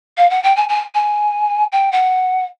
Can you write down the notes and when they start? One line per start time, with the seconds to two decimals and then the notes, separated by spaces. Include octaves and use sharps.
0.17 F5
0.30 F#5
0.44 G5
0.56 G#5
0.69 G#5
0.95 G#5
1.72 G5
1.92 F#5